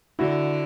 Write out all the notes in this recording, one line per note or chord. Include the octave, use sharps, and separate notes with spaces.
D3 E4 F#4